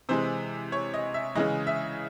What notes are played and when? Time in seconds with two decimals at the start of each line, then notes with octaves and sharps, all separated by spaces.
0.09 C3 E3 G#3 C5
0.72 C#5
0.94 D#5
1.14 E5
1.35 C#3 E3 G#3 D#5
1.67 E5